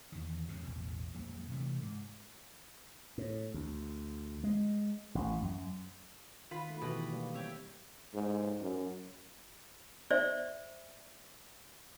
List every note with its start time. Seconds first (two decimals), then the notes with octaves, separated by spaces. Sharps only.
0.12 E2 D#3
0.49 F2 G#2 C#3
0.63 A1 E2 B2
1.14 F2 A#2 F#3 G3
1.50 C3 E3 F3 A3
1.82 G#2
3.18 A2
3.54 D2
4.44 G#3
5.15 A1
5.42 F#2
6.51 D#3 F4 B4 F#5 B5
6.70 A3
6.82 B2 D#3 E3 G4 B4 F#5
7.10 G3 A#3
7.34 C4 G4 C#5 E5
8.13 G#2
8.61 F#2
10.11 C5 D5 E5